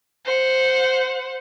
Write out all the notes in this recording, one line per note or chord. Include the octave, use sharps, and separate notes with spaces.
C5 F#5